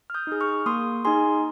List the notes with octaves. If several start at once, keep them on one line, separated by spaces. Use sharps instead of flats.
F6
D#6 G6
D#4 G#4
C#6 F6
A#3 C6 D#6
D#4 G#4 G#5 C6